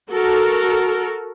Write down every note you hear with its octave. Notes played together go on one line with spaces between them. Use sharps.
F#4 A4 A#4